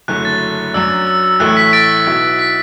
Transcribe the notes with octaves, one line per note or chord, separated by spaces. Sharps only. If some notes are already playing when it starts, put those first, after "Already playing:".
F#1 F#2 D3 A3 E4 F#6
A6
F#2 F#3 D4 E6
E6
E6
A1 A2 A3 E4 F#6
B6
A6 D7
B1 B2 B3 E4
B6